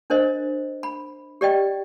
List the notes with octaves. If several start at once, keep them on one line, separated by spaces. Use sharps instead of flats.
D4 A#4 C5 D#5
B5
G4 D5 D#5 G5